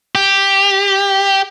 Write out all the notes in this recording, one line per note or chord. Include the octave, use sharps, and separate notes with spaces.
G4